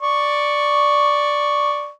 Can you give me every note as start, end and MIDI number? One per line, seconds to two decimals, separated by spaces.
0.01 1.90 74
0.01 1.90 85